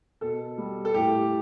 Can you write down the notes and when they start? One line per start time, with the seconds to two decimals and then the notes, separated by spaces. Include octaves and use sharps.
0.21 B2 A4
0.58 G3
0.85 A4
0.94 A2 G4